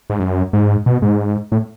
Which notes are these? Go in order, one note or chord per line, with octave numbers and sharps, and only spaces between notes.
G#2
F#2
G#2
B2
G#2
A2